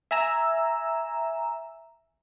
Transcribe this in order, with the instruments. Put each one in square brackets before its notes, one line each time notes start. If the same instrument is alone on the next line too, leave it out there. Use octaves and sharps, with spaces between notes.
[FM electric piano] E5 G#5 A#5 E6